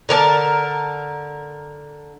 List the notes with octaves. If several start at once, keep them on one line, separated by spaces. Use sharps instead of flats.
D3 A#4 C#5 A5